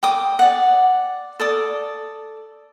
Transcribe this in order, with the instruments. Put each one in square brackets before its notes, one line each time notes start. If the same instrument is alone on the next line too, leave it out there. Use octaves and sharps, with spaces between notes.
[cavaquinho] G5 D6 D#6
D5 F#5
A4 D5 D#6